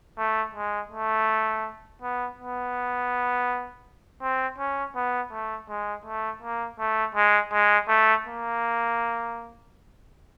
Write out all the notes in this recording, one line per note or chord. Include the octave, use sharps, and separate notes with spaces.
A3
G#3
A3
B3
B3
C4
C#4
B3
A3
G#3
A3
A#3
A3
G#3
G#3
A3
A#3